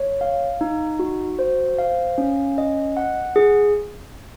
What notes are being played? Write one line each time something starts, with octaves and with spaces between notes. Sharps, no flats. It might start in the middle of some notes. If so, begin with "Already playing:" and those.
Already playing: C#5
F5
D#4
F#4
C5
F5
C#4
D#5
F#5
G#4